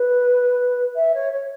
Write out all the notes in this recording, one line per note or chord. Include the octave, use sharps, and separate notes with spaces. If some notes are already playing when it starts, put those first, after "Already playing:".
Already playing: B4
E5
C#5
C#5